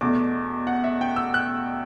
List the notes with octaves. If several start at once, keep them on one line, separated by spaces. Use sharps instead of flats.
E2 B2 A3 D4 D6
F#5
E5
G5
E6
F#6